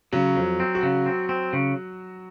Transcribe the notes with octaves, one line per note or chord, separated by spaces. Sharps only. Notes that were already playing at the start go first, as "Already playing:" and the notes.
C#3 F#3
F2
C4
F#4
C#3
C4
C4
C#3